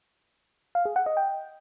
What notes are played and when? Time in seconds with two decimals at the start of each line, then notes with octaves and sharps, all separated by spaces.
0.75 F5
0.85 G#4
0.96 F#5
1.06 D#5
1.17 G5